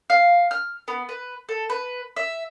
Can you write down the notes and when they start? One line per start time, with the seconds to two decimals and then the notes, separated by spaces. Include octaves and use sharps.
0.10 F5
0.51 F6
0.88 B3
1.09 B4
1.49 A4
1.70 B4
2.17 E5